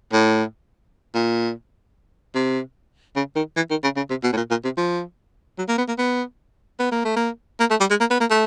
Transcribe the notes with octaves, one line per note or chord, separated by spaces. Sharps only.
A2
A#2
C3
C#3
D#3
E3
D#3
C#3
C#3
C3
B2
A2
A#2
A#2
C3
F3
F#3
A#3
B3
A#3
B3
B3
A#3
A3
A#3
A#3
A3
G3
G#3
A#3
B3
A#3
A3